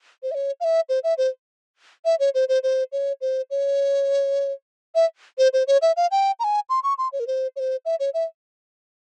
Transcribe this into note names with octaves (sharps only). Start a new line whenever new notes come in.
C5
E5
C#5
F5
E5
C5
E5
C5
E5
C#5
C5
C5
C5
C#5
C5
C#5
E5
C5
C5
C#5
E5
F5
G5
A#5
G#5
C6
C#6
C6
C#5
A#4
C5
C#5
C5
E5
C#5
E5